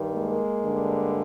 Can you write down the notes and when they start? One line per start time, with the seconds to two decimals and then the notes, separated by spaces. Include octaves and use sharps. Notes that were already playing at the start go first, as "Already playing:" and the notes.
Already playing: G2 D#3
0.12 G#3 A#3
0.61 G2 D3